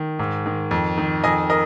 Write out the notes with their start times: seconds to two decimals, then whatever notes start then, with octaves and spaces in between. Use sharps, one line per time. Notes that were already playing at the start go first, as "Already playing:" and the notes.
Already playing: D#3
0.19 G#2
0.46 D#3
0.71 F2
0.98 D#3
1.24 F2 D#5 G#5
1.50 A#4 D#5